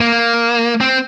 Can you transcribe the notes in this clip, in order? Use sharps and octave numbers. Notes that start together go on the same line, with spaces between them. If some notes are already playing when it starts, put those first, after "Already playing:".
A#3
C4